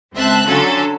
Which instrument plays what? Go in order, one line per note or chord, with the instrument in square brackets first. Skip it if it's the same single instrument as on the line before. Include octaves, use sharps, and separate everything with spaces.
[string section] C#2 C4 C5 E5 A5 F#6
D3 F#3 C#4 F4 A4